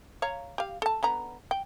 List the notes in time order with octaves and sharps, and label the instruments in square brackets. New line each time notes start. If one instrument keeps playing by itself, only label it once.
[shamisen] C#5 F5 A#5
G4 F5
A4 A5
D3 B3 A#5
G5